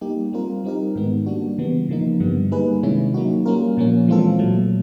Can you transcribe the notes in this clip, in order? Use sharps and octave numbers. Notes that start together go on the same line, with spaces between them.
G3 A#3 D#4 G4
G3 C4 F4 A#4
G3 C4 D#4 G4 A#4
G#2 D#3 G#3 B3 D#4
G3 A#3 D4 F#4
C#3 E3 G3 B3
C#3 F3 A#3 D#4
G2 D3 G3 B3
G3 A#3 D#4 G#4 B4
C3 D#3 G#3 C#4 E4
F#3 A#3 D#4 F#4
G3 A#3 C#4 F4 A#4
A#2 F3 A#3 C#4
E3 G#3 C4 F4 A4
A#2 F#3 A3